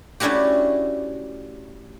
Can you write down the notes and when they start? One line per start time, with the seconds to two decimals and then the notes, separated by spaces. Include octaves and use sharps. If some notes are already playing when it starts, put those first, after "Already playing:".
0.20 A3 C#4 D4 E4 F#4 G4